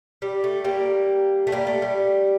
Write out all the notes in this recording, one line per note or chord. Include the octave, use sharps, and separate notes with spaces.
G3
A3
G3 A#3
A3
G3 A#3
A3
G3